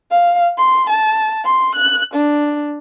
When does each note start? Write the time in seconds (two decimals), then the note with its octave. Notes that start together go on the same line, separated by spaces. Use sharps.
0.10 F5
0.58 C6
0.90 A5
1.44 C6
1.75 F#6
2.14 D4